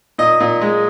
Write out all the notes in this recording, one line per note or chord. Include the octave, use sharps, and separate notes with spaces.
A#2 D#5
A#2
G#3